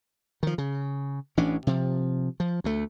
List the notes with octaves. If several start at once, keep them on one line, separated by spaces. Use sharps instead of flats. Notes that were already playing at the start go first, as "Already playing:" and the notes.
D#3 F3
C#3
A1 E3 C#4 D4
C3 F3
F3
D2 A3